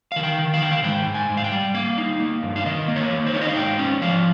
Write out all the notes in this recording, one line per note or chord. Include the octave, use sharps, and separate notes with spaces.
D#3 F5
G5
D#3
F5
D#3 G5
F5
G#2 G5
G#2
G#5
G#2
F5
G5
G3
A#3 F5
D#4
A#3
G2
F5
D#3 D#5
A#3
C#5
A#3
C5
D#4 C#5
D#5
F5
G#2 G5
C#4
F3 F5